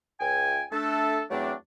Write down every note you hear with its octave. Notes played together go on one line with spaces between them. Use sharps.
C#2 G5 G#5
A3 D4 A4
E2 F#3 A3 C4 D4